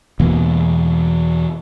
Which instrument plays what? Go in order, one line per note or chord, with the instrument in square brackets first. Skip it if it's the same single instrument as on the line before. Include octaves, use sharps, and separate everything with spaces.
[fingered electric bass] E2 B2 E3 A#3